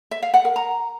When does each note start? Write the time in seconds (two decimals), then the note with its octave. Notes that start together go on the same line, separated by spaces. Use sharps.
0.11 E5
0.22 F5
0.34 F#5
0.45 A#4
0.56 A#5